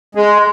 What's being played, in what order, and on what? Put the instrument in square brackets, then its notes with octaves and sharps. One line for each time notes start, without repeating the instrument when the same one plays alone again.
[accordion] G#3